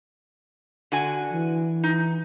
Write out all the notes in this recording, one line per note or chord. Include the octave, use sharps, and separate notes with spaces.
D3 F#4 G#5
E3
D#4